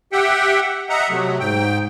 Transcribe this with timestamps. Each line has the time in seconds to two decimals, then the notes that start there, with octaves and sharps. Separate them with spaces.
0.13 G4 E5 F#5 G5
0.90 D#5 E5 F#5 A#5
1.10 C3 F#3 A3
1.40 G#2 G5